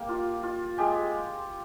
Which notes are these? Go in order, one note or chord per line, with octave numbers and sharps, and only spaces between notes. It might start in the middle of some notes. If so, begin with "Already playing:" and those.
Already playing: A#3 G4
F4
F4
G#3 G4